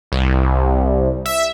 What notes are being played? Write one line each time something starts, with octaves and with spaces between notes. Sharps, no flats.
C2
E5